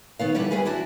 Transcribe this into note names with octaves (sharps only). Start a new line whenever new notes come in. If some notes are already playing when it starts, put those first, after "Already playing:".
D#3 B3 F5
D3 E3 G3 G4 B4 F#5
E2 G3 G#4 B4 G#5
E3 D4 E4 F#4